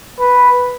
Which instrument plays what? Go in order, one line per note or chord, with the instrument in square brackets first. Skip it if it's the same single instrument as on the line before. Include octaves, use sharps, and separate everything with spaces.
[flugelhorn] B4